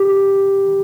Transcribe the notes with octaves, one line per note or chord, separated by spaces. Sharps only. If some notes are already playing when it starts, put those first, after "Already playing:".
Already playing: G4